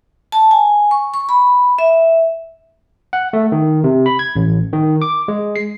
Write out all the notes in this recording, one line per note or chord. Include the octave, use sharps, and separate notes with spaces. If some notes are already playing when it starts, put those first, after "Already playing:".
A5
G#5
C#6
C#6
B5
E5
F#5
A3
D#3
C3
B5
G#6
A1
D#3
D6
G#3
C7